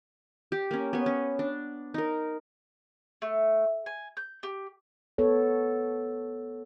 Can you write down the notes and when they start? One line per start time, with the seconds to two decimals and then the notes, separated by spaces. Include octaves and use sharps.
0.52 G4
0.71 A#3 C#4
0.93 B3 C#5
1.06 C#4
1.39 D4
1.94 D#4 A#4
3.22 A3
3.86 G#5
4.17 G6
4.43 G4
5.18 B3 A4 C#5